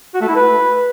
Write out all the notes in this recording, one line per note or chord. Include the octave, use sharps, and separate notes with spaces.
F#4
A3
E4
B4